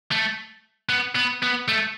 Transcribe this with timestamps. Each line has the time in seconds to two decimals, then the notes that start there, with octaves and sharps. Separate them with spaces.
0.11 A3
0.89 B3
1.16 B3
1.43 B3
1.68 A3